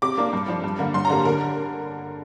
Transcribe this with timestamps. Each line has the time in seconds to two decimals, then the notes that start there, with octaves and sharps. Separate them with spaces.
0.02 C3 D6
0.18 A#3 D4
0.33 G2
0.48 F3 D4
0.64 G2
0.79 D3 A#3
0.94 G2 C6
1.05 A#5
1.10 D3 G3 A#3
1.25 D3 A#4